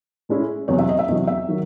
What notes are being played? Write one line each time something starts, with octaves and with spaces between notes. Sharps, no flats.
A2 G#3 C#4 E4
E2 C3 F#3 C#5
E5
D#5
E5
E2 C3 F#3 D#5
E5
D#3 F#3